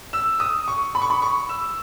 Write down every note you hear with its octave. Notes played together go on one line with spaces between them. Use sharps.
E6
D#6
C#6
B5
C#6
B5
C#6
E6